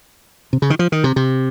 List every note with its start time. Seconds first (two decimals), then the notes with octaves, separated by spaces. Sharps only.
0.53 C3
0.62 C#3
0.70 D#3
0.79 F3
0.92 D#3
1.04 C3
1.16 C3